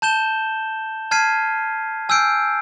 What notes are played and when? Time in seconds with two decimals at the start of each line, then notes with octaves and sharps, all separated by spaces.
0.02 A5 G6 E7 G7
1.11 A5 F6 G#6 B6 C7 D#7
2.09 G#5 E6 F6 G6 C7 D7